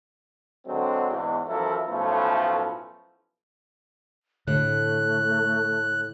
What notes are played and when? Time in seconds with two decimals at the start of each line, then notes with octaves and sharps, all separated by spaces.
0.66 D3 F#3 G#3 C4
1.09 E2 G#2
1.48 F#2 E3 F3 E4 A4 A#4
1.88 B1 A2 F3 A3 C#4 B4
4.47 A2 D3 A3 F#6